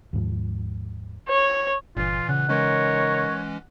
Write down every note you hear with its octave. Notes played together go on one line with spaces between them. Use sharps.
D#2 G#2 F3
C#5
G1 A#2 E3 F4
C#3 F#5
E3 G#3 C#4 D#4 A#4 C#5